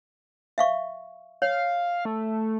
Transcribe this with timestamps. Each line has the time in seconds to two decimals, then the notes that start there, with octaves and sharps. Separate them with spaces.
0.58 E5 F5 C#6
1.42 C#5 F5
2.05 A3